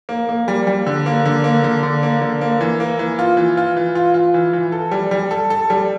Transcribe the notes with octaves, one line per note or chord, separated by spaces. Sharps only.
A#3
A#3
G3
G3
D3
A#3
D3
A#3
D3
D3
A#3
D3
A#3
E3
A#3
E3
F4
E3
F4
E3
F4
F4
E3
E3
A4
G3
G3
A4
A4
G3